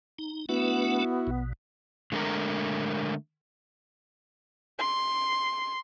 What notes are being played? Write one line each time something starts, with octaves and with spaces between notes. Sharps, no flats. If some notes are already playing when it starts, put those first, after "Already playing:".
D#4
A3 B3 D4 E4 F#4 B4
A#1 B2
D3 G#3 A3 D4 A#4 A#5
C6